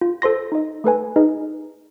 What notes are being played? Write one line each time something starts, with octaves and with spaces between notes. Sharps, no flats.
F4
A4 C5 C6 A#6
D#4 D#5
A3 A4 B4 G#5
D#4 G#4 B4 D#5